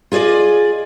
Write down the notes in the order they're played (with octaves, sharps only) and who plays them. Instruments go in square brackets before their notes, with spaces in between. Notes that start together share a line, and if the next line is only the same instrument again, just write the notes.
[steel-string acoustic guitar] F4 G#4 C5 D5 D#5